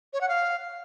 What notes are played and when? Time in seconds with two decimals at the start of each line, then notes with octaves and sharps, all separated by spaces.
0.13 C#5
0.21 F#5
0.29 F5